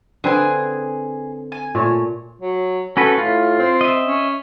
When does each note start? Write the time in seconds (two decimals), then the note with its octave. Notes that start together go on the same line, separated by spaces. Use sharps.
0.24 D3 C4 G#4 B4 G#5
1.52 G#5
1.75 A#2 A3 C#5
2.41 F#3
2.97 C#4 F#4 A4 B4
3.18 A2 F4
3.59 C4
3.81 D#5 E5
4.06 C#4